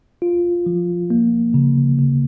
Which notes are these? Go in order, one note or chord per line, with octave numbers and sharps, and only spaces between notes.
F4
F3
A#3
C#3
C#3